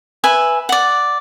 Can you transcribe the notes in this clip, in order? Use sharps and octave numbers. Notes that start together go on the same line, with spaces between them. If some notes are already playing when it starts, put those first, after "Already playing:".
B4 E5 G#5
D5 F#5